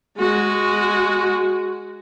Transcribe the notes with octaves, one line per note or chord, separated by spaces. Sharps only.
G#3 F#4